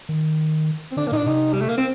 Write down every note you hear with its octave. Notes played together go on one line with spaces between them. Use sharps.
D#3
C4
D3 D4
A#3
A#2 D4 D#4
C3 D#4
G3
A3
A#3
C4